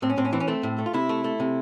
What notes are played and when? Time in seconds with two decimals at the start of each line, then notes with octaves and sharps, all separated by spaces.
0.02 A2 C4
0.10 C#4
0.17 A2 C4
0.25 C#4
0.33 E3 C4
0.40 C#4
0.47 A3 C4
0.63 A2
0.78 A3
0.86 F4
0.94 C3 E4
1.09 A3
1.24 A3
1.40 C3